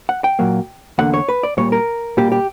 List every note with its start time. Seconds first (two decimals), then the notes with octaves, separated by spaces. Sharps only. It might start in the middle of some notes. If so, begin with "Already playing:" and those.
0.09 F#5
0.24 G5
0.39 A#2 F#3 A#3
0.98 E2 D3 A#3 F#5
1.14 C#5
1.29 B4
1.43 D5
1.57 A#2 G3 A#3 C#5
1.72 A#4
2.17 A#2 G3 A#3 G4
2.32 G4